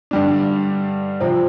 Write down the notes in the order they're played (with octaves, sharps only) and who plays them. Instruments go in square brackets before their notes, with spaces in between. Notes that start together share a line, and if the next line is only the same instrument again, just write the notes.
[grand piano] G2 D3 G3 D4
C3 F3 C4